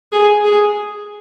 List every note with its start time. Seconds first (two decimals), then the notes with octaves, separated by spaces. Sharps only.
0.12 G#4
0.44 G#4